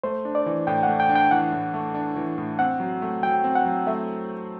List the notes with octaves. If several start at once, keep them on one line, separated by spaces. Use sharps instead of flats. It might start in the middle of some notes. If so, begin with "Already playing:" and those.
A3 C5
D4
D5
E3
A2 G5
F#5
A3
G5
D4
G5
E3 F#5
A2
A3
D4
E3
A2
C4 F#5
F#3
A3
F#3 G5
C4
F#5
F#3
A3 E5